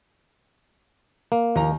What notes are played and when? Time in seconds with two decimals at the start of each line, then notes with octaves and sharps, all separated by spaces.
1.32 A#3
1.55 D#2 A#5